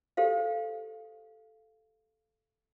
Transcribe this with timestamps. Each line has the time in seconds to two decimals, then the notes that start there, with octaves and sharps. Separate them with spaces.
0.17 G4 A4 C5 F5